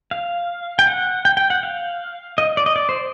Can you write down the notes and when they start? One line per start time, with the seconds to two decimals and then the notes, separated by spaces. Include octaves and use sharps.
0.11 F5
0.79 G5
0.87 F#5
1.25 G5
1.37 G5
1.50 F#5
1.63 F5
2.38 D#5
2.57 D5
2.66 D#5
2.76 D5
2.89 C5